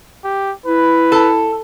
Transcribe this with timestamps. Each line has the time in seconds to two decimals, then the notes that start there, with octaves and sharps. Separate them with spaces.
0.24 G4
0.66 E4 B4
1.12 A4